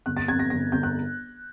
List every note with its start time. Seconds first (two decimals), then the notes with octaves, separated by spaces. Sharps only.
0.06 G1 F#6
0.17 A6
0.28 F2 G#6
0.39 A#6
0.50 G1 A#6
0.72 G1 G6
0.83 F#6